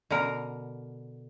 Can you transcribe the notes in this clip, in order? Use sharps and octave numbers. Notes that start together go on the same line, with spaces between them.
B2 D3 A#4